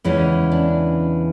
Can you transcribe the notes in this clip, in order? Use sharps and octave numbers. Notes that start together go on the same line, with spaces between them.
E2 C#3 E3 G#3 C#4
D4